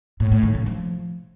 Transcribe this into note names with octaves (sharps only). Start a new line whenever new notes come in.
A2
A2
D#3
C#3
F3